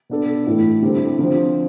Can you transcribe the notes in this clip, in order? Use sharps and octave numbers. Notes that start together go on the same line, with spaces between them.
B2 B3 D4 A4
A2 E3 A3 E4 A4
D3 G3 C4 E4 A4
D3 F3 C4